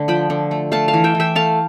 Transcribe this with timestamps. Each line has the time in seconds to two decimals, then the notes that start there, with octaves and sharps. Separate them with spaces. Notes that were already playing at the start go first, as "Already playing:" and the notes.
Already playing: D3 A3
0.08 F3 G5 B5
0.30 D3
0.51 A3
0.72 A3 F5 A5
0.88 F5 A5
0.93 E3
1.04 E5 G5
1.15 E3
1.20 E5 G5
1.35 A3 F5 A5